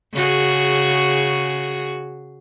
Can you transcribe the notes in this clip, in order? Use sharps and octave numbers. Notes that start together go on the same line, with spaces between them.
C#3 F#4 G#4